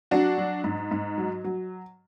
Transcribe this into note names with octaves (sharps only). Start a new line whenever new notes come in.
F#3 D4 F#4
F#3
G#2
G#2
F#3
F#3